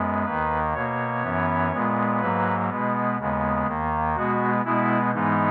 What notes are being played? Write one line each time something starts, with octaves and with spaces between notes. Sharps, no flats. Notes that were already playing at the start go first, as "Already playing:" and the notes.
Already playing: F#2 G#3 B3
D#2 D#3 A#3 B4
B2 A#3 C#5
F#2 E3 B3
A#2 G#3 B3
G#2 F#3 A#3 B4
B2 G#3 B3
D#2 C#3 G#3 B3
D#2 D#3 A#3
B2 G#3 B3 F#4
B2 G#3 B3 E4
G#2 E3 G#3 B3 D#4